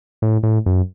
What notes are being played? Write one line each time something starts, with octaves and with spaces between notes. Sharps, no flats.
A2
A2
F#2